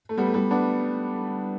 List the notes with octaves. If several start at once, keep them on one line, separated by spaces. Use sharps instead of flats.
A3
G3 B3
A3
G3 B3
B3 D4